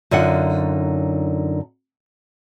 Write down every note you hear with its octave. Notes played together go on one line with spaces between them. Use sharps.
F#2 D3 D#4 F4 F#5